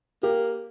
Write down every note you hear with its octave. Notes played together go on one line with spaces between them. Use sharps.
A#3 G4